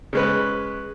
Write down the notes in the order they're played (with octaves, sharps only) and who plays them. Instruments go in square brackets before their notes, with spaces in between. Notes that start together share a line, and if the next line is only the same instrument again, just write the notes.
[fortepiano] C#3 G#3 B4